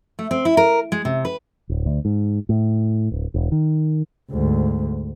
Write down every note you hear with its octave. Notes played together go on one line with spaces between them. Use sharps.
A3
C4
E4
A#4
G#3
C3
B4
D1
D2
G#2
A2
D1
E1
D#3
D2 G#2